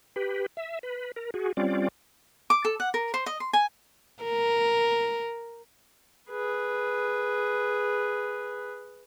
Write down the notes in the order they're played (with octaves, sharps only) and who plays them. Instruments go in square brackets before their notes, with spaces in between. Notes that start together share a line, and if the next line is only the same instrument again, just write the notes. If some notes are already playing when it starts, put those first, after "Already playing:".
[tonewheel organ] G4 B4
E5
B4
A#4
F#4 G#4
G3 C4 C#4 F4 D5
[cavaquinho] D6
A4
F#5
A#4
C5
D#5
C6
G#5
[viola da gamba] A#4
[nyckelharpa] G#4 B4